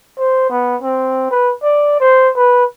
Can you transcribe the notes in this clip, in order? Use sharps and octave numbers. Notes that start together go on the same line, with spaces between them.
C5
B3
C4
B4
D5
C5
B4